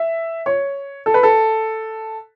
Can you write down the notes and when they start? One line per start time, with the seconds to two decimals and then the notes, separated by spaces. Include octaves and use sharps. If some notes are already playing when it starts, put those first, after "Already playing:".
Already playing: E5
0.46 C#5
1.06 A4
1.14 B4
1.23 A4